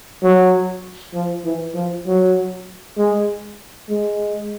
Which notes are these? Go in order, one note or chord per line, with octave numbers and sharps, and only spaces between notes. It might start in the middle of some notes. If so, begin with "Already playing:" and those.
F#3
F3
E3
F3
F#3
G#3
G#3